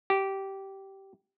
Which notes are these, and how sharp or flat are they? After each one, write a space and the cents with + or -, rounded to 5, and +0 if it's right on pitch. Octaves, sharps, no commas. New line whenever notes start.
G4 -15